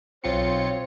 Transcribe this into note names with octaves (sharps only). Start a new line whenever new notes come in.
B1 C4 F4 C#5 C#7